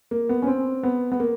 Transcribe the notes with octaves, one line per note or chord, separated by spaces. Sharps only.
A#3
B3
C#4
C4
B3
B3
A#3